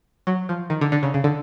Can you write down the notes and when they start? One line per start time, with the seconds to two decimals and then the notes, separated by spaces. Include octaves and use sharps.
0.27 F#3
0.49 F3
0.70 D#3
0.81 D3
0.92 D3
1.03 C#3
1.14 C#3
1.24 D3